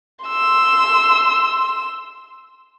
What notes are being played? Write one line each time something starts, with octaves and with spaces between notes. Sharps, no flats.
C6 E6